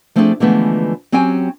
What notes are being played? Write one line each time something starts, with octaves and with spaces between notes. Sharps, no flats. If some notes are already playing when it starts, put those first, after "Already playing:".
F3 A3 C4 D4 G#4 A4
D3 E3 F3 G#3 A3 B3
F#3 C4 C#4 G4 G5 G#5